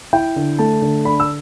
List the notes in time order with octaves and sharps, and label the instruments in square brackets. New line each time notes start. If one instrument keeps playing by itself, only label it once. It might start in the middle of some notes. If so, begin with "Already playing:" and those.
[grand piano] E4 G5
D3
A3 A5
D3
D4 B5
E6